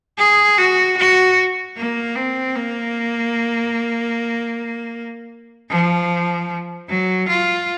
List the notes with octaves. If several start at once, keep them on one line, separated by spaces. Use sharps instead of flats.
G#4
F#4
F#4
A#3
C4
A#3
F3
F#3
F4